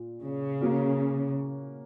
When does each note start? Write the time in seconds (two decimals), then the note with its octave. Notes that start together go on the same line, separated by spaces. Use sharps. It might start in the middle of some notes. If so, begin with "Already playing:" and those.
Already playing: A#2
0.22 C#3
0.60 A#3 C#4 F#4